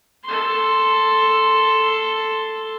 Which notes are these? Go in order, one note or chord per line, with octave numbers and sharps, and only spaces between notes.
A4 C6